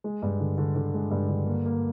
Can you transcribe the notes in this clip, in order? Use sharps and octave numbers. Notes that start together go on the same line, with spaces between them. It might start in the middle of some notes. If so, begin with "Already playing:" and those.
G#3
G2
D3
D3
D3
G#3
G2
D3
A#3
A#3